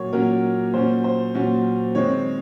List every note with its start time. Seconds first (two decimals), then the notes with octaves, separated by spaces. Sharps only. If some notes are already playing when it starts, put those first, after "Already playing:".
Already playing: A#2 F#3 A#3 C#5
0.12 A#2 F#3 A#3 C#4 A#4
0.74 A#2 F#3 C#4 C5
1.04 C5
1.35 A#2 F#3 C#4
1.95 D#3 G#3 C4 C#5